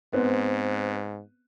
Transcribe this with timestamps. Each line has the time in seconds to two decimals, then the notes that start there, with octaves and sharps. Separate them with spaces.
0.13 G#2 B3 C4